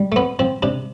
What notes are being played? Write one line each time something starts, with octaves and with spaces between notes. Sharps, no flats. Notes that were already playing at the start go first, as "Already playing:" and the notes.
Already playing: G3
A3
F2 B3
F3 C4
C3 D4